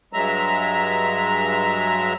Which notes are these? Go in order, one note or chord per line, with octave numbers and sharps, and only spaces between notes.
G2 F#3 G#3 E5 A#5